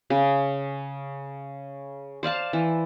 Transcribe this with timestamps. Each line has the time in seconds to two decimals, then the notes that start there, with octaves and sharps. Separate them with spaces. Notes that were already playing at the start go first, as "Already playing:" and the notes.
0.10 C#3
2.23 C5 D5 F5 A5
2.53 E3